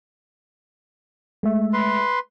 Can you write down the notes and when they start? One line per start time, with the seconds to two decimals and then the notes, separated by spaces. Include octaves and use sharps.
1.43 G#3 A3 E5
1.73 B4 C6